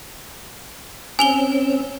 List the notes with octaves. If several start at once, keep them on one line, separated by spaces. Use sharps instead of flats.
C4 C#4 G#5 E6 F7 G7